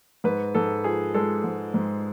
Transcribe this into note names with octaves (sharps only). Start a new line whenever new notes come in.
G#2 B4
G#2 A4
F3 G#4
G#3 A4
G#2
G#2